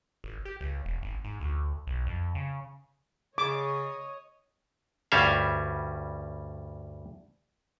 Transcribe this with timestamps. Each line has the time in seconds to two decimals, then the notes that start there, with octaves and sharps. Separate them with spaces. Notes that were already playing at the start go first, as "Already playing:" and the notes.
0.24 G#1
0.45 G4
0.61 C#2
0.85 E1
1.03 G#1
1.24 G#2
1.40 D2
1.87 B1
2.07 F2
2.35 C#3
3.38 C#3 C#5 D#5 D6
5.12 D2 G2 G3 C#4 E5 F5